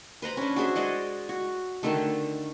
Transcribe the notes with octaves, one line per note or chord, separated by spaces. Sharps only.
B4 C5 A#5 B5
C#4 D4
F#4 G#4 C5 E5
G#3 D5 D#5 F#5
F#4
D3 D#3 A3